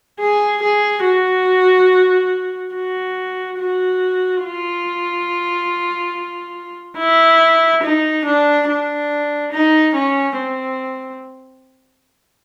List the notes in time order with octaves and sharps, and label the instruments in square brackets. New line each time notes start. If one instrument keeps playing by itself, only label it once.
[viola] G#4
G#4
F#4
F#4
F#4
F4
E4
D#4
D4
D4
D#4
C#4
C4